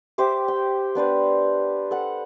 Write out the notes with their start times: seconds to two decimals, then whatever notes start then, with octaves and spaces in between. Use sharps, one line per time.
0.18 G4 C5 E5 D6
0.48 G5
0.95 B3 D4 B4 C5
1.91 A4 F#5